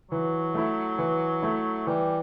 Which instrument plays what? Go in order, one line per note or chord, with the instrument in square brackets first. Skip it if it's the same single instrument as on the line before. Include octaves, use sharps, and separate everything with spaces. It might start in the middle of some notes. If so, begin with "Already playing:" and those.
[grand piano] E3 [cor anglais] F#3
[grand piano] A3 E4
E3
A3 E4
[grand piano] E3 [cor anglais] G3